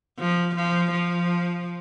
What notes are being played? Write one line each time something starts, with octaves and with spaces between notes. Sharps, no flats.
F3
F3
F3